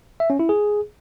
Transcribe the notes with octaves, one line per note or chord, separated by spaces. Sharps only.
E5
C#4
E4
G#4